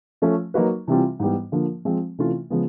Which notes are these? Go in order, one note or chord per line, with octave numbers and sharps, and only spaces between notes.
F3 A3 C#4
F#3 A#3 D#4 F#4 B4
C3 E3 G3 C4 F4
G#2 E3 G3 B3
D3 F3 A#3
F3 G#3 C4
C3 E3 A3 C#4 F4
C#3 F3 G#3 B3